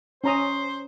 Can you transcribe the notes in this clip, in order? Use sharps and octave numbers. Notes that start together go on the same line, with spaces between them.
C#4 C5 A#5 D#6